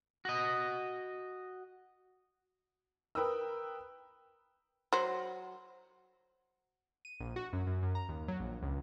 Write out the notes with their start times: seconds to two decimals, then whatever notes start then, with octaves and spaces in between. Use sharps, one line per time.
0.25 F#4 D#5
3.15 A#4 B4 G5 D#6 E6
4.93 F#3 C5
7.05 D#7
7.20 A#1
7.36 F#4
7.53 F#2
7.67 F#2
7.83 F#2
7.95 A#5
8.09 D#2
8.28 F#3
8.40 A#1
8.63 C#2